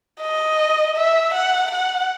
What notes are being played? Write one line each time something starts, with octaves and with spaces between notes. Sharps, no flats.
D#5
E5
F#5
F#5